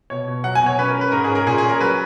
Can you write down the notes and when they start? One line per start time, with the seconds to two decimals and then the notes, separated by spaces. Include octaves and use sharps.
0.10 B2 C#5
0.28 B2
0.44 F#3 F#5
0.55 G#5
0.61 B2
0.66 C#5
0.79 C#4 B4
0.90 A#4
0.95 C#4
1.01 B4
1.12 G#2 A#4
1.24 G#4
1.30 C#4
1.35 A#4
1.46 A#2 G#4
1.58 G#4
1.64 C#4
1.69 A#4
1.80 F#3 B4